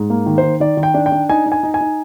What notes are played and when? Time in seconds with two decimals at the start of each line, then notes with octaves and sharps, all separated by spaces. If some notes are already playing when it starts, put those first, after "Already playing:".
Already playing: G#2
0.10 A#3
0.26 D#3
0.38 C5
0.43 D#3
0.60 D#3 D5
0.77 D#3
0.83 G5
0.94 D4
1.06 G5
1.12 D4
1.29 D#4 G#5
1.46 D#4
1.52 G#5
1.63 D#4
1.74 G#5
1.81 D#4